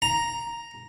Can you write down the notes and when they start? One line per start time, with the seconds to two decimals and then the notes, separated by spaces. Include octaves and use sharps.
0.02 A#5